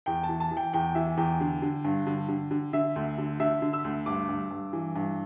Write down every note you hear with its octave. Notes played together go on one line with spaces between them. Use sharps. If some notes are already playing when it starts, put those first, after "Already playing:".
E2 G5
A5
E3
A5
E3
G5
E2 G5
E3 E5
E2 G5
D3
D3
G2
D3
D3
D3
D3 E5
D2
D3
D3 E5
D3
E6
D2
G2 D6
G2
G2
E3
G2